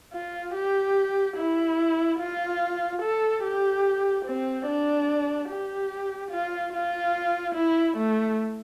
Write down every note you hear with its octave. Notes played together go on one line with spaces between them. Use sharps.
F4
G4
E4
F4
A4
G4
C4
D4
G4
F4
F4
E4
A3